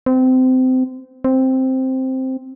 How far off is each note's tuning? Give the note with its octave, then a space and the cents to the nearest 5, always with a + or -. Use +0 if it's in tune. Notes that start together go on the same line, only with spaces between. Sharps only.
C4 -25
C4 +0